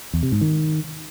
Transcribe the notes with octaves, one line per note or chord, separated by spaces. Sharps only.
E2
C3
G#2
D#3